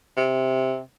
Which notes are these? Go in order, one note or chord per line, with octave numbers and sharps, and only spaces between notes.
C3